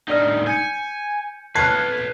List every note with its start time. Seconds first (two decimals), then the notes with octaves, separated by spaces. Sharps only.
0.08 A2 D4 D#4 D5 F6
0.47 G#5 G6 C#7
1.55 B4 C#5 A5 F6 F#6 G#6 C7